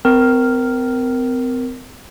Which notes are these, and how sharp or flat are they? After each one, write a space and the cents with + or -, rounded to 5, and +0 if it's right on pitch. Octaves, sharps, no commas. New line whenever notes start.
C4 -35 A#4 +0